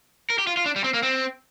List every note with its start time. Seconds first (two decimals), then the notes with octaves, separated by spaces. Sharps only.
0.30 A#4
0.39 G4
0.47 F4
0.57 F4
0.66 D4
0.76 G3
0.84 C4
0.94 A#3
1.03 C4